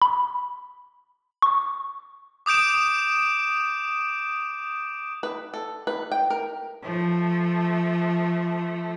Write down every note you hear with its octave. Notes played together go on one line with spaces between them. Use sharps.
B5
C#6
D6 D#6 G6 D7 E7
B4
A4
B4
G5
A#4
F3 A3